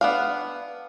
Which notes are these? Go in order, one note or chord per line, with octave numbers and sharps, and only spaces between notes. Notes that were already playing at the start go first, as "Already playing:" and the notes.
B3 D4 F5